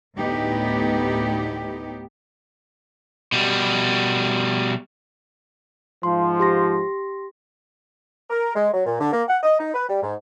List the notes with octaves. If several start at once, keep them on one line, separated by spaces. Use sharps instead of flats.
D2 A2 B3 D#4 G4
B2 G3
G#2 F3 C6
G4 C6 A#6
A#4
G#3
F#3
A#2
D3
A#3
F#5
D#5
D#4
B4
G3
G#2